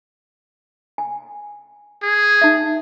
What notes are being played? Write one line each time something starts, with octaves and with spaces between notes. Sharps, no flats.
G#5
G#4
D#4 E5